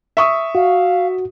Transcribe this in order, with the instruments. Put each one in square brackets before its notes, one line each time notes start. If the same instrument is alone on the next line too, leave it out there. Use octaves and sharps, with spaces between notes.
[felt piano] E5 C#6 D#6
[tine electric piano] F#4 [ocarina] F5